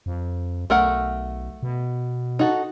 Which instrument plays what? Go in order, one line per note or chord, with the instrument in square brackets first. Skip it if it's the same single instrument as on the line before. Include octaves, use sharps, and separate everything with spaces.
[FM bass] F2
[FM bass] B1 [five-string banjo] A3 A#4 F#5
[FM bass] B2
[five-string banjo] D#4 F#4 A4